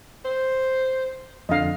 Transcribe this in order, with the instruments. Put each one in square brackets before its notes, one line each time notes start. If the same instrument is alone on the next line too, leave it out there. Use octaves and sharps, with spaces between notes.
[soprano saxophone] C5
[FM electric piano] F2 D3 [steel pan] D#5 F5